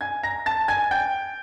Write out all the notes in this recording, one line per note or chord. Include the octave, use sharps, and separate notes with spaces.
G#5 G#6
A#5 A#6
A5 A6
G#5 G#6
G5 G6